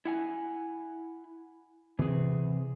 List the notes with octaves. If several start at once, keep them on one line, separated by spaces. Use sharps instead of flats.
E4 F#5 G#5
C3 E3 C4 G#4